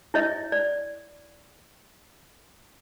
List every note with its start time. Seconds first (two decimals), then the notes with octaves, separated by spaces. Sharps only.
0.14 E4 C#5 D#5 E5
0.52 D5